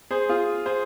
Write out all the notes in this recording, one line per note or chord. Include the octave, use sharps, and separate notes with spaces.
G#4 C5
F4 G#4
G#4 C5